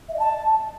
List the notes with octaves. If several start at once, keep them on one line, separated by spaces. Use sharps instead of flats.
E5
D#5
A5